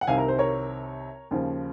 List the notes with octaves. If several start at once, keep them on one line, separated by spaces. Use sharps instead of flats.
F#5
C2 C3 D#3 F5 G#5
A#4
C5
A#4 C#5
D#2 C#3 F3